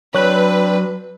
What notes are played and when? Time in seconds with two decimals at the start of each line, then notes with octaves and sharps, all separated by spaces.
0.15 F#3 C4 D4 B4 C#5 F#6